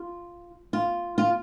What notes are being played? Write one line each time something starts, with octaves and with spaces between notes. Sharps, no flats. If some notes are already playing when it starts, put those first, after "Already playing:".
Already playing: F4
F4
F4